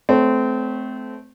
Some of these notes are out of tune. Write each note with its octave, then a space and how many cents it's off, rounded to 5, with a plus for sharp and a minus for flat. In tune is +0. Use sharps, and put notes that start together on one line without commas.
A3 -25 C4 -25 C#5 +0